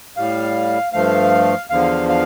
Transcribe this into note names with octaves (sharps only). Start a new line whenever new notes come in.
A2 G3 F5
G2 F3 A3 F5
E2 D3 F3 F5
F5